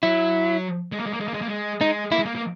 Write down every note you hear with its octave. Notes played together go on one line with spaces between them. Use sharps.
F#3 E4
G#3
A#3
G#3
A#3
G#3
A#3
G#3
A#3
G#3
G#3 D#4
A#3 E4
G#3
A#3
A#3